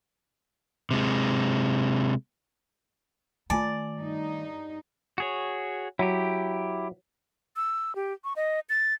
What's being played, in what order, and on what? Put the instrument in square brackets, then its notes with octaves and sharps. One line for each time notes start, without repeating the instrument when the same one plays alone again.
[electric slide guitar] C3 G#3
[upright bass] D#3 A3 [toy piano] F4 G#5 A5 [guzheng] D5
[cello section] G2 D#4
[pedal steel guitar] F#4 G#4 C#5
[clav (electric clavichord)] F#3 [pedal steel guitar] E4 G4
[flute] E6
G4
C#6
D#5
A6